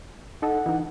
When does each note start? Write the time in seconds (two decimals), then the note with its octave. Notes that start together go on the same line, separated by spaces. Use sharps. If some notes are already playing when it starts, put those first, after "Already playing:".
0.42 D#4 A4 D#5 F#5
0.66 E3 D#4